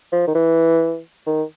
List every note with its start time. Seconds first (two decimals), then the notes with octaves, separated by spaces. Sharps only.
0.12 F3
0.27 D#3
0.35 E3
1.27 D#3